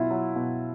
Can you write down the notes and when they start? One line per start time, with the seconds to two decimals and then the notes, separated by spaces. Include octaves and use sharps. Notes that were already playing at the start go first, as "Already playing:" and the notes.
Already playing: B2 F#3 E4 F4
0.11 F#3
0.36 B2